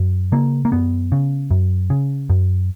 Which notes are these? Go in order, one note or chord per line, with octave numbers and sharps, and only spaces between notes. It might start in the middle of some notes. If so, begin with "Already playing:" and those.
Already playing: F#2
C#3 A#3
A#3
F#2 B3
C#3
F#2
C#3
F#2